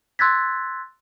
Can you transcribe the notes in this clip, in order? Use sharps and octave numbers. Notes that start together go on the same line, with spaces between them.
C6 E6 F#6 G#6 A6 B6